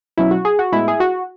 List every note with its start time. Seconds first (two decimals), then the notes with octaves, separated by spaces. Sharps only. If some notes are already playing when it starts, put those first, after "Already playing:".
0.17 B2 F#3 C#4 E4
0.31 F#4
0.45 G#4
0.59 F#4
0.72 A2 G#3 B3 E4
0.88 G#4
1.00 F#4